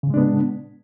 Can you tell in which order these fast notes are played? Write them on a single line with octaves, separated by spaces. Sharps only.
C#3 A2 G#3 D4 B3